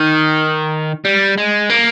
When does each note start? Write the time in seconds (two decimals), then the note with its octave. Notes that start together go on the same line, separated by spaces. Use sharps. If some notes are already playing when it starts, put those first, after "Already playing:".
Already playing: D#3
1.05 G3
1.38 G#3
1.70 A#3